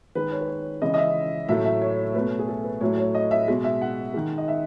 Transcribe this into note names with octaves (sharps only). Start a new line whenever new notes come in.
D#3 G#3 B4
C#5
B4
C#5
C#3 E3 G#3 D#5
D#5
E5
A2 F#3 A3 E5
E5
C#5
B2 F#3 A3 B4
G#4
A4
B4
A2 F#3 A3 C#5
C#5
D#5
E5
B2 G#3
E5
F#5
D#3 G#3
D#5
E5